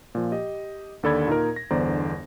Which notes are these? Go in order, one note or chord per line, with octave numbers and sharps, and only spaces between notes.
A#2 F3
G4 D#5
D#2 D3 A4 D5 B5 G#6
A#2 D#4 A#4
A#6
G1 E2 D3 C5 D5 A#5